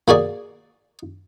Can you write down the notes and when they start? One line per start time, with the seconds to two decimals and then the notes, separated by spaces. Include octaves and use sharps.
0.08 A#3 F#4 G#4 D5